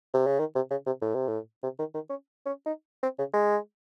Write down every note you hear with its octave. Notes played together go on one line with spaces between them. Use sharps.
C3
C#3
D#3
C3
C#3
C3
A2
C3
A2
C3
D#3
D#3
C#4
C#4
D#4
C4
C#3
G#3